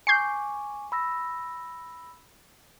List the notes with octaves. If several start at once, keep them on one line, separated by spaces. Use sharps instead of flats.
G#5 C#6 D6 G6 C7
B5 E6 A#6